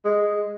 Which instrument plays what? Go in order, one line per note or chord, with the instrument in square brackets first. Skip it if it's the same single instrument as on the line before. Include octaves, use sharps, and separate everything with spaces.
[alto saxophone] G#3